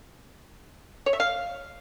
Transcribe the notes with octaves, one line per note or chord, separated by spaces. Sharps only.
C#5
E5
F5